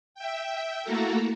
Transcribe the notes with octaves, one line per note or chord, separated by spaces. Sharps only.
E5 G5
A3 A#3 E4 F#4 A4 A#4